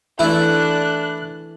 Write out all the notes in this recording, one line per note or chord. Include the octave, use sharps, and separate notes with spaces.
E3 A3 D4 E4 A4 F#6